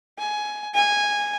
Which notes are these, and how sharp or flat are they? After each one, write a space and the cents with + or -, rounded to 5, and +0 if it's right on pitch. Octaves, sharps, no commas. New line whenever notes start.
G#5 +15
G#5 -10